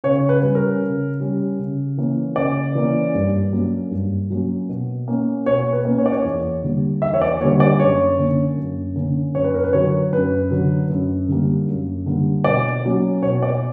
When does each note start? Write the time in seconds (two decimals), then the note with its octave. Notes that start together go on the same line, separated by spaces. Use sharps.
0.04 C#3 C#5
0.29 B4
0.42 G3 C#4
0.55 A#4
0.82 C#3
1.20 G3 C#4
1.59 C#3
1.98 E3 A#3 C#4
2.36 C#3 D5
2.75 E3 A#3 C#4
3.15 G2
3.53 F#3 A#3 C#4
3.91 G2
4.30 F#3 A#3 C#4
4.69 B2
5.08 A#3 C#4
5.46 B2 C#5
5.73 B4
5.85 A#3 C#4
5.98 C#5
6.06 D5
6.12 C#5
6.25 E2
6.63 D3 G3 A#3
7.02 E2 E5
7.14 C#5
7.21 D5
7.41 D3 G3 A#3 C#5
7.60 D5
7.79 F#2 C#5
8.19 D3 A#3 C#4
8.57 F#2
8.96 D3 A#3 C#4
9.35 F#2 C#5
9.44 B4
9.54 A#4
9.64 B4
9.73 D3 F#3 C#5
10.13 F#2 B4
10.51 D3 F#3
10.90 F#2
11.28 D3 G3 A#3
11.67 F#2
12.06 D3 G3 A#3
12.44 B2 D5
12.84 F#3 A#3 C#4
13.23 B2 C#5
13.43 D5